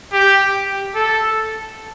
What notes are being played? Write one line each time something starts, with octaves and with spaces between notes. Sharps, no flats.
G4
A4